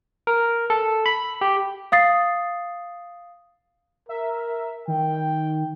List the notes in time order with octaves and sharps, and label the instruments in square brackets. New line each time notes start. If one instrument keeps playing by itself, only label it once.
[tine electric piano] A#4
A4
B5
G4
[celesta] F5 D#6 A6 C7
[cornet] A#4 [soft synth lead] E5
[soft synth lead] D#3 [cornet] G5